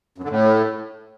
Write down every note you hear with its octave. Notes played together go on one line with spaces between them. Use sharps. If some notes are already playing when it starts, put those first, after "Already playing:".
F#2
D3
A2